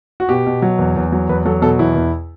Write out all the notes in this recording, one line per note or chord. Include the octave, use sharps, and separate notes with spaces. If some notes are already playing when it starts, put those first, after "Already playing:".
F#4
B2 G4
B2
F#3
E2
E2
F#3
E2 B4
F#3 A4
B2 A4
E2 E4
E2